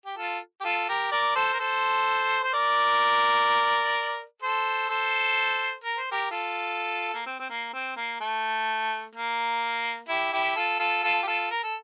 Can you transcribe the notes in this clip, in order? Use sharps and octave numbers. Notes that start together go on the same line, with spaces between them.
G4
F4 A4
G4
F4 A4
G4 A#4
A#4 D5
A4 C5
A#4
A4 C5
C5
A#4 D5
A4 C5
A4 C5
A#4
C5
G4 A#4
F4 A4
A#3
C4
C4
A#3
C4
A#3
A3
A#3
E4 G4
E4 G4
F4 A4
F4 A4
F4 A4
G4
F4 A4
A#4
A4